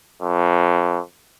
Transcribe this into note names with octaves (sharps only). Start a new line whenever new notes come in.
F2